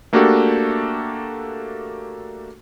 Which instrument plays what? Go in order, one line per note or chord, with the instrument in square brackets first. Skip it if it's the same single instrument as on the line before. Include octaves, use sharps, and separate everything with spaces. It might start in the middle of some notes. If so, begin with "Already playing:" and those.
[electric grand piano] A3 A#3 D4 F#4 G4 A4